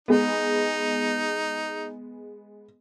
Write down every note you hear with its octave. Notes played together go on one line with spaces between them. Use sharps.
G#3 B3 D#4